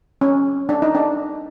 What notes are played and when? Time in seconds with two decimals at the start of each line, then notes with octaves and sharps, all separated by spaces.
0.21 C#4
0.69 D4
0.82 D#4
0.95 D4